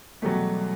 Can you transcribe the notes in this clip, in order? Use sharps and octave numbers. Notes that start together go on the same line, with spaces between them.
E2 B2 F#3 G3 A3